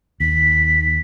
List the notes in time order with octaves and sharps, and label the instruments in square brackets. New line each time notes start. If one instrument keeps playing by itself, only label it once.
[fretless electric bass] D#2 [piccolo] B6